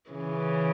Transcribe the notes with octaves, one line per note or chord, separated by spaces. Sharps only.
C#3 E3